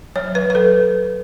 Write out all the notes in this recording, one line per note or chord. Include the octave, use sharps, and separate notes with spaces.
F#3 C#5
B4
F#3 B4
A4